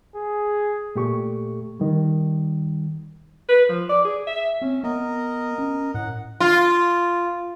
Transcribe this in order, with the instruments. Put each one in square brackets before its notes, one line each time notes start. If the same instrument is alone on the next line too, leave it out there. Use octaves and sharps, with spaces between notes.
[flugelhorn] G#4
[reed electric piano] A#2 A3 G4 A4 C#6
D#3 G3
[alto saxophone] B4
F3
D5
G#4
E5
[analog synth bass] C4 [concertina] C#4
[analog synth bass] B3 [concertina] A#4 D#5
[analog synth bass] C#4
[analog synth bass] A2 [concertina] F#5
[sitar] F4